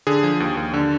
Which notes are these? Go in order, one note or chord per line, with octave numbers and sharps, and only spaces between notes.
D3 G#4
F3
D#2
D#2
D3